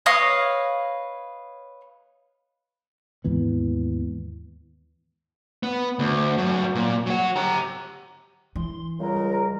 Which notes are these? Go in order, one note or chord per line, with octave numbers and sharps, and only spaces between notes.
B4 C#5 D#5 F5
D#2 G#2 E3 B3
B3
D2
G2 F#3
A#2
F#3 F#5
G4 A#5
E3 C6
C#2 G3 A#4